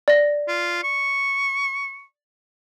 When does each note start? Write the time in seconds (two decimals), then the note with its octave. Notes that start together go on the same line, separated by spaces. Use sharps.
0.08 D5 A#6
0.48 F4
0.84 C#6